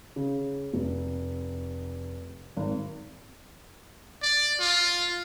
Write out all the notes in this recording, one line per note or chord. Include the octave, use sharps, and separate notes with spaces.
C#3
F1
G#1
D5
F4